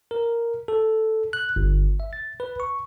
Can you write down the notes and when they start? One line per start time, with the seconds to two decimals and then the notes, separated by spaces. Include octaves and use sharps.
0.11 A#4
0.68 A4
1.33 F#6
1.56 G1
2.00 E5
2.13 A6
2.40 B4
2.60 C#6